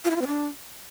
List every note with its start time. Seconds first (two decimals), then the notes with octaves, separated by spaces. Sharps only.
0.05 F4
0.10 E4
0.16 F4
0.21 C4
0.27 D4